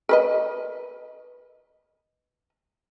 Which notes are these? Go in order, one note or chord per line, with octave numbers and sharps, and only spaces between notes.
A#4 B4 D#5